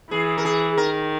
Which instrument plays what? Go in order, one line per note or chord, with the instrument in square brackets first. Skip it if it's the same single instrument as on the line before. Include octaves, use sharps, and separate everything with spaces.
[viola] E3 [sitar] G#4
[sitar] A#4
G#4
[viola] D#3 [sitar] A#4